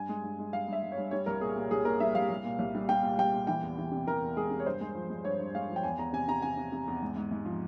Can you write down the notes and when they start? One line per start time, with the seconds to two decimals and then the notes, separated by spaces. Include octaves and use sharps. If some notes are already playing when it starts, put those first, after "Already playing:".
Already playing: G2 G#5
0.09 G#3
0.23 G2
0.39 G#3
0.53 G2 F5
0.68 G2 E5
0.83 G2
0.92 C#5
0.98 G2
1.11 G3 C#5
1.26 C2 A#4
1.41 A#2 G#4
1.56 A#2
1.71 C2 G#4
1.85 A#2 A#4
2.00 G3 E5
2.15 C2 F5
2.30 C2
2.45 A#2
2.59 C2
2.75 G3
2.89 G3 G5
3.03 A#2
3.18 C2 G5
3.34 A#2
3.47 E3 G5
3.63 E2
3.78 E3
3.92 C3
4.07 E3 A#4
4.22 E2
4.36 G#3 G#4
4.51 C3
4.60 C#5
4.66 G2 C5
4.81 G#3
4.95 F3
5.10 G#3
5.24 G2 C#5
5.40 G2
5.55 G#3 F5
5.70 F3
5.76 G5
5.83 E2 G#5
5.99 E2 A#5
6.13 C3 G#5
6.28 C3 A#5
6.42 C3 G#5
6.57 C3
6.72 C3
6.88 E2
7.02 G#2
7.17 G#2
7.31 G#2
7.45 F3